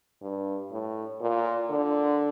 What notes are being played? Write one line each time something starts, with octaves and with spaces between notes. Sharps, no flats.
G2
A2
A#2
D3